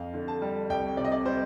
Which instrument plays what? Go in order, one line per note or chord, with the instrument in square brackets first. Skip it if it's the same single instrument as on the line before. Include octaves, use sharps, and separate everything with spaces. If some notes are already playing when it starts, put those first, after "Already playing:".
Already playing: [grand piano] F2 [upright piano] F5
[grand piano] D3
[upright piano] A5
[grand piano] G3
[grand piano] C2 [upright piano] G5
[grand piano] C3 [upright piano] D5
[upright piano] D#5
D5
[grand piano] G3 [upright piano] C5